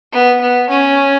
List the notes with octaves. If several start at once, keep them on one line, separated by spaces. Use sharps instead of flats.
B3
B3
C#4